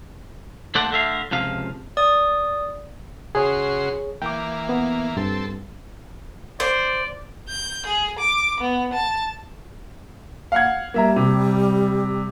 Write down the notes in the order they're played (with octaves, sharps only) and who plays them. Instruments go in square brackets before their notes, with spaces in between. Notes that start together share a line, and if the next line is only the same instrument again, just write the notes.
[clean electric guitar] D#2 A3 A4 C5 D5 F#5
D3 A3 E5 F5
C#2 C3 F3 F5
[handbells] D5 D#6
[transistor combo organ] C#3 F#4 C6 [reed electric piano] G#4 C#5
[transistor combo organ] E3 A#3 [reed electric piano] G5 D6
[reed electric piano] B3
[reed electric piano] G2 [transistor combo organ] C4 A4
[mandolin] C5 [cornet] D5
[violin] G6
G#4
D6
B3
A5
[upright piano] F5 F#5 G#6
[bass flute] G3 [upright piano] A#3 E5 A#5
[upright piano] C3